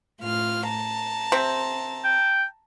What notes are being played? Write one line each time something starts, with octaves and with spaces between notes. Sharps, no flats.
A2 F4 F6
A5 A#5
C3 C4
G5